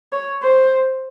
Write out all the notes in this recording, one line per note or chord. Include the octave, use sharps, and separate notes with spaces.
C#5
C5